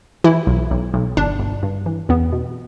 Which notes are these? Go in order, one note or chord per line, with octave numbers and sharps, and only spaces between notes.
E3 E4
B1
B1
B1
G1 D4
G1
G2
E3
E2 B3
B2